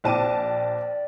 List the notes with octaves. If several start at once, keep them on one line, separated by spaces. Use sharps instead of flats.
A#1 C5 D5 G5 A5 D6 D#7